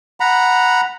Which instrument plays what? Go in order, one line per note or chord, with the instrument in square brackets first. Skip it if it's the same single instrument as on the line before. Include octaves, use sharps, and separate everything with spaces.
[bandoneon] F#5 A#5 B5